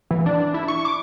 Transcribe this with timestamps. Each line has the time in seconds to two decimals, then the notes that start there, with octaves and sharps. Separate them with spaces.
0.11 E3
0.26 D4
0.54 E4
0.68 C#6
0.85 D6